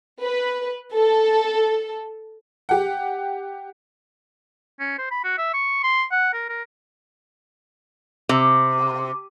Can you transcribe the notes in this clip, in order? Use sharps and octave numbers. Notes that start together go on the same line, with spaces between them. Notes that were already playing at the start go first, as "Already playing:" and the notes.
B4
A4
G4 F#5
C#4
C5
B5
F#4
E5
C#6
C6
F#5
A#4
A#4
C3